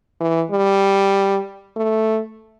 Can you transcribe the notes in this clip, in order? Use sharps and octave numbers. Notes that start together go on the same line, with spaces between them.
E3
G3
A3